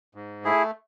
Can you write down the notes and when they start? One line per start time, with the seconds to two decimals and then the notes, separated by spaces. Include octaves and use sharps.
0.15 G#2
0.45 A3 E4 G#4